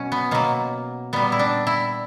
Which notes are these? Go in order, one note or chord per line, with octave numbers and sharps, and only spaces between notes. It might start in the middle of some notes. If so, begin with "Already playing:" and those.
Already playing: B2 F#3 C#4
B3
B2 F#3 A#3
A#2 G3 B3
E4
D4
E4